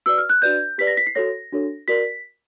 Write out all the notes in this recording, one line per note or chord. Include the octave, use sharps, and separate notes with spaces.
F#4 B4 D5 E6
F6
F#6
D4 F#4 B4 D5 G6
G4 B4 D5 B6
A#6
B6
C7
F#4 A4 C#5 A#6
D4 F#4 A4 C#5
F#4 A#4 D5 B6